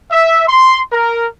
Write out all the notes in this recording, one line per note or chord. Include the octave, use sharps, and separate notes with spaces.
E5
C6
A#4